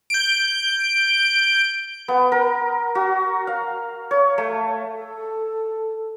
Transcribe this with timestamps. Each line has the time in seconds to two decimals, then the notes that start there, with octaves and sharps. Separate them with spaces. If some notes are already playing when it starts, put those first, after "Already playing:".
0.10 G6 D7
2.08 B3
2.32 A#4
2.95 F#4
3.47 F5
4.11 C#5
4.38 A3
4.91 A4